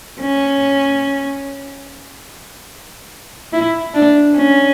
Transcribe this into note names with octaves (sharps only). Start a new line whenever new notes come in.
C#4
E4
D4
C#4